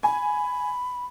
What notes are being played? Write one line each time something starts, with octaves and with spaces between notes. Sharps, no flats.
G#5 B5